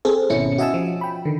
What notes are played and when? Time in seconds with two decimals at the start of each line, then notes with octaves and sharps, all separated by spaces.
0.05 C4 G#4 A4 C5
0.29 G#1 B2 C#4 E4 C#7
0.58 F#4 D#5 E5 G#5 A5 E6
0.74 F3
1.01 G5 B5
1.25 D3 D#3